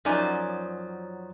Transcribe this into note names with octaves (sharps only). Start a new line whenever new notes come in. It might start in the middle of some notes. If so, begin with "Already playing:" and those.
F#2 F3 F#3 D#4 D5 G#5